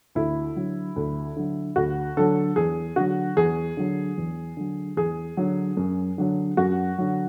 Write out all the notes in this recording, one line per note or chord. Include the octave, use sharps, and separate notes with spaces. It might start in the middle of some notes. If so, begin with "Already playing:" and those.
D2 E4
D3 F#3
D2
D3 F#3
D2 F#4
D3 F#3 A4
E2 G#4
D3 F#3 F#4
E2 G#4
D3 F#3
E2
D3 F#3
E2 G#4
D3 F#3
F#2
D3 F#3
F#2 F#4
D3 F#3